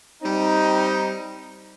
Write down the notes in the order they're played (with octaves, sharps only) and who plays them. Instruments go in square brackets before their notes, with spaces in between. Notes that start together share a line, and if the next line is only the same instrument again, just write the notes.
[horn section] G3 C4 D#4